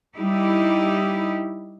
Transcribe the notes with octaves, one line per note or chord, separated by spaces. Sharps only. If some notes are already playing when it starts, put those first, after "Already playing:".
G3 D#4 E4 G4